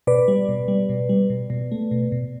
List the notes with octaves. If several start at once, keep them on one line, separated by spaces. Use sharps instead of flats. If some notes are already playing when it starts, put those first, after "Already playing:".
B2 B4 D5
G3
B2
G3
B2
G3
B2
B2
A3
B2
B2